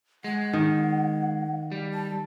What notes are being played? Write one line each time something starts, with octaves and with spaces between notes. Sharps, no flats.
G#3 F#5
D#3
G3
A5